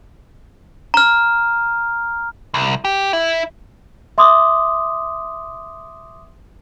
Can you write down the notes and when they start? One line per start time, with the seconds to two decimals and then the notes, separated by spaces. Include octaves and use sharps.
0.94 A#5 F6
2.54 C2
2.85 G4
3.13 E4
4.18 E5 C6 D6 D#6